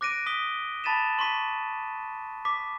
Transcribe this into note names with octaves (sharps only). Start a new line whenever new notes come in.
D6 F#6 A#6 D7 D#7
D#6 B6 G7
A5 B5 A6 B6 D#7 E7
C6 C#6 B6 D#7
D6 B6